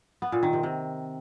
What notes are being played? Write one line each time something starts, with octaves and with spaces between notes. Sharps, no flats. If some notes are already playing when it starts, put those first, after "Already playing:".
B3
A#2
D#3
C3
C3